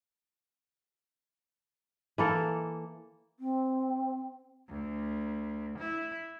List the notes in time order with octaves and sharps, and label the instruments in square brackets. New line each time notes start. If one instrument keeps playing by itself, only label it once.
[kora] E3 A#3 A4
[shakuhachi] C4
[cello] D2
E4